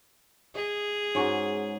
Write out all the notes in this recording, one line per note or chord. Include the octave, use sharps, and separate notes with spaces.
G#4 D#5
G#2 C#4 F#4